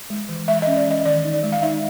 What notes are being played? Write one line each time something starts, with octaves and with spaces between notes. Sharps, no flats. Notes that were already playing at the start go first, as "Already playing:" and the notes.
G#3
E3
G#3 E5
D#5
C#4
D5
E3 D#5
D#3 D5
D#4
D5
G#3
F5
D#4 E5